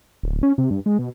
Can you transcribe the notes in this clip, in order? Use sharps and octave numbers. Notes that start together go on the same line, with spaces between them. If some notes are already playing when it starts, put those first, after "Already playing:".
D1
C#4
C3
G2
G#3
B2